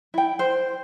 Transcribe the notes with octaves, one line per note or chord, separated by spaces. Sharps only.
E4 G5
C5